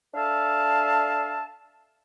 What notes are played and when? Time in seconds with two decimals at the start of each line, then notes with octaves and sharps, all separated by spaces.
0.14 D4 A4 E5 F5 A5